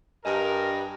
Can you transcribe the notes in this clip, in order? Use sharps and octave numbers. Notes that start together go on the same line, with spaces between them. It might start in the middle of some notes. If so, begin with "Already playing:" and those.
G2 A#4 D#5 G#5